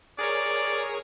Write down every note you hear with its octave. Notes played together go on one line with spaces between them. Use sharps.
G#4 A#4 C#5 D5